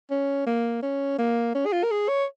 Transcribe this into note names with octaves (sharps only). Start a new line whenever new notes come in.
C#4
A#3
C#4
A#3
C#4
G#4
F4
A#4
G#4
C#5